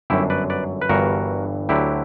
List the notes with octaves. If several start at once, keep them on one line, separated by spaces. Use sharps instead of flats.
G1 F#2 D3 F#3 E4 G4
B4 D5
B4 D5
B4
G1 G2 E3 F#4 A#4
D2 D3 F#3 E4 G4